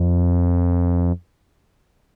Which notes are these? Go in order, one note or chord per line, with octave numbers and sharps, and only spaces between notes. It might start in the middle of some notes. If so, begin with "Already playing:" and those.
Already playing: F2